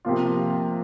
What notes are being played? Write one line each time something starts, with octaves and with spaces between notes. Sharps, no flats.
C3 F3 A#3 F4